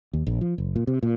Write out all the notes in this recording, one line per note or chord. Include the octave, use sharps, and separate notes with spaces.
D#2
A#1
F3
F#1
A#2
C3
A#2